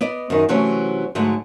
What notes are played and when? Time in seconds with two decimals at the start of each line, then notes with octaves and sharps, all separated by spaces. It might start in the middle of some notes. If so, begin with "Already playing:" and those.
0.01 B3 D5 D#5
0.30 F#2 D#3
0.49 C3 E3 F#3 A3 C4 C#4
1.15 G#2 D3 F#3 A3